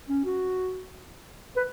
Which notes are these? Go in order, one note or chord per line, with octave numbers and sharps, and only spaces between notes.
C#4
F#4
B4